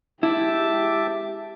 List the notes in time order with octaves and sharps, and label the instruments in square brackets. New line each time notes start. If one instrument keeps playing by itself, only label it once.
[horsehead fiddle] G#3 G4 [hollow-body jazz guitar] E4 [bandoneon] E5 A5 D6